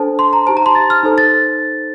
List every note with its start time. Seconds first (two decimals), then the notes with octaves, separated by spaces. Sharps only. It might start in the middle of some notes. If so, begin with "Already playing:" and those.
Already playing: D4 A4 C5 A5
0.19 C6
0.33 A#5
0.47 D#4 G4 C5 A5
0.57 A#5
0.66 C6
0.75 A6
0.90 F6
1.03 D#4 A4 C5
1.18 A6